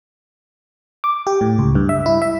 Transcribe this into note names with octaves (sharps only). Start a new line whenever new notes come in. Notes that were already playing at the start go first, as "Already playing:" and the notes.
D6
G4
A2
C#2
G2
E5
E4
E5